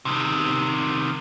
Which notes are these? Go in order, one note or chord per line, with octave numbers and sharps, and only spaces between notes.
C3 D#3